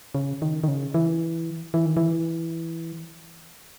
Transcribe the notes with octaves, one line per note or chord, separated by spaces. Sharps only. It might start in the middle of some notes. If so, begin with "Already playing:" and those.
C#3
D#3
D#3
C#3
E3
E3
D#3
E3